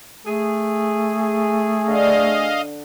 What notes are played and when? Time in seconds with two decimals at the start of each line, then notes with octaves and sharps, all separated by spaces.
0.25 A3 G#4
1.88 D3 D#5 F5